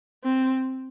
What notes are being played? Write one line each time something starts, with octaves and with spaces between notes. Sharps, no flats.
C4